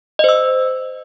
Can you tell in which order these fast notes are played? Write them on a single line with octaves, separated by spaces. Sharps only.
D#5 C5 E6